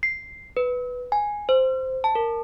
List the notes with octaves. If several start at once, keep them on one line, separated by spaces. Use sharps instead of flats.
C7
B4
G#5
C5
A5
A#4